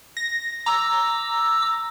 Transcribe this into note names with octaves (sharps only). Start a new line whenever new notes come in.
A#6
A#5 D6 E6